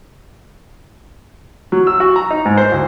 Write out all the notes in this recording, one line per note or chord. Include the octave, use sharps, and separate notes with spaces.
F#3
E6
F#4
A#5
D#4
G#2
C5
D2